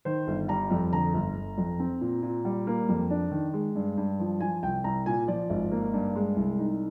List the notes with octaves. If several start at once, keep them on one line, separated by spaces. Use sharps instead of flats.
D#3 C5
G1
G3 A#5
F2
D3 A#5
G1
G1
F2
C4
A#2
A#2
G3
A#3
F2
D4
D#3
G#3
G2
G2
F3
F3 G#5
C2 G5
C2 A#5
A#2 G#5
F3 D5
G#1
A#3
G2
G#3
C2
D#4